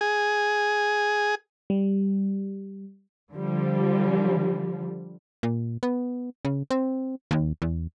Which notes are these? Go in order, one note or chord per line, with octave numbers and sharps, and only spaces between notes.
G#4
G3
D3 F3 G3
A#2
B3
C#3
C4
D#2
E2